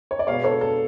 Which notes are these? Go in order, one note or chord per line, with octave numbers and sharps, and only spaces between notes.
C#5
D5
B2 G#3 B3 C#5 F5
A4 C#5
A4